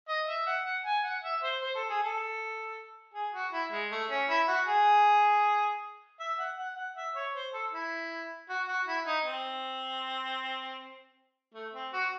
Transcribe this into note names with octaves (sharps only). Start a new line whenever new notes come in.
D#5
E5
F#5
F#5
G#5
F#5
E5
C5
C5
A4
G#4
A4
G#4
F#4
E4
G#3
A3
C#4
E4
F#4
G#4
E5
F#5
F#5
F#5
E5
C#5
C5
A4
E4
F#4
F#4
E4
D#4
C4
A3
C4
F#4